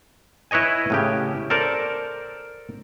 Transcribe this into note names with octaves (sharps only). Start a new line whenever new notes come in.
E4 B4 C#5 D#5 G#5
A2 C#3 G4
A4 A#4 C5 D5